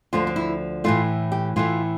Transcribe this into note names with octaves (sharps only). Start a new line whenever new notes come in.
D2 D3 F3 A3 F4
D4
E4
A2 E3 A3 F4
G4
A2 E3 A3 F4